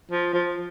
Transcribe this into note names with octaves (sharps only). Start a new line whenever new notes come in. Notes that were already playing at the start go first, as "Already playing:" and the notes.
F3
F3